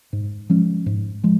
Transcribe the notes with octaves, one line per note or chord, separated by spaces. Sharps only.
G#2
F3 G#3 C#4
G#2
F3 G#3